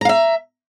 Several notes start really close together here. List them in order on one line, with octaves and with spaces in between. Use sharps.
A#5 F5 E5